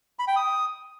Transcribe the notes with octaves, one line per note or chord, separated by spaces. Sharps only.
B5
G5
D#6